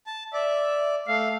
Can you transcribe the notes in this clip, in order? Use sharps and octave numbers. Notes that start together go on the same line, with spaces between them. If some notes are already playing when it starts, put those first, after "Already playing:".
A5
D5 E5
A3 F5